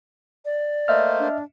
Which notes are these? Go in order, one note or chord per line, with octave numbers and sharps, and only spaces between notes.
D5
A3 A#3 C5 D#5 E5 F6
D4